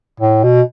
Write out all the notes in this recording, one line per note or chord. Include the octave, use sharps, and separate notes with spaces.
A2
B2